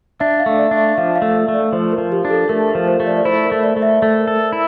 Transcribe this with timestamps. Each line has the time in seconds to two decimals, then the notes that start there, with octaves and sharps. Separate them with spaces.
0.20 D4 E5
0.39 F5
0.46 A3
0.59 D5
0.71 D4
0.77 E5
0.97 F3 F5
1.15 F5
1.22 A3
1.36 E5
1.48 A3
1.54 D5
1.73 F3 C5
1.92 A#4
1.98 F3
2.12 G4
2.25 D4
2.30 A4
2.49 A3 A#4
2.69 A#4
2.75 F3
2.88 C5
3.00 A3
3.07 D5
3.17 D5
3.25 E4 C5
3.45 A#4
3.52 A3
3.63 D5
3.77 A3
3.82 E5
4.02 A3 E5
4.21 A#4
4.27 A4
4.53 E4